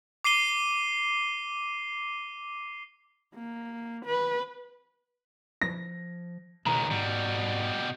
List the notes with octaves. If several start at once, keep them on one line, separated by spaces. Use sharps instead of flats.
D6 C7 D#7 G7
A#3
B4
F3 A#6
C#2 B2 D#3 A#5
G#2 B2 G3